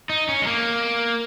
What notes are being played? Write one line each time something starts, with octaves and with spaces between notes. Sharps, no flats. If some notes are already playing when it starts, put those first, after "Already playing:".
D#4
C#4
G#3
A#3